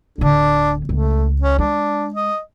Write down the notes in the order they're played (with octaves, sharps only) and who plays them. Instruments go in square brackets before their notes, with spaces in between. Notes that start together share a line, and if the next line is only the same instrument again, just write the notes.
[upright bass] D1 D3 [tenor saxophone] D4
[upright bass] C#2 [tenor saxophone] A3
[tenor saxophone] C#4
[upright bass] G#3 [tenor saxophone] D4
[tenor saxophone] D#5